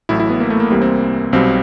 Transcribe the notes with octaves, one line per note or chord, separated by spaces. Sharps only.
A1 A2 F#3 E4
E4
B3
A#3
A3
A#3
C2 C3 E3 G3 A#3
C4
B1 B2 G3 C4